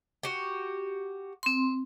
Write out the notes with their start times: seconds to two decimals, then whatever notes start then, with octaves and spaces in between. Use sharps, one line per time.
0.23 F#4 G4
1.43 C4 C6